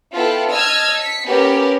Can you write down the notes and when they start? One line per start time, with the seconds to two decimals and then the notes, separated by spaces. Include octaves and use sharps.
0.14 B3 E4 F4 A4 G5
0.51 D#5 A5 E6 F6 G#6
0.98 B6 C#7
1.27 A#3 B3 C#4 G4 A#4